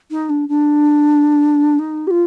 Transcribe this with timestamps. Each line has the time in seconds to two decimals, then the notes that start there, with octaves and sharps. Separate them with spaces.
0.11 D#4
0.29 D4
0.49 D4
1.79 D#4
2.07 G4
2.11 F4